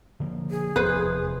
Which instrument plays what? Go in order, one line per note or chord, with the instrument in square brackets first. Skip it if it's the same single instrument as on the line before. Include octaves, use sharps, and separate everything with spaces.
[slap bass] D3 F3 A#3
[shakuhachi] G#4
[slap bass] F1 E2 F3 [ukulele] B4 C5